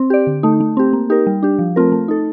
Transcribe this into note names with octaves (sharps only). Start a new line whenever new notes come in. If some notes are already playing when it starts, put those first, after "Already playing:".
Already playing: C4
G4 D5
D3
A3 D#4
A3
C4 G4
A#3
D#4 G4 A#4
G3
D4 G4
F3
A3 C4 F4 A#4
A3
D#4 A4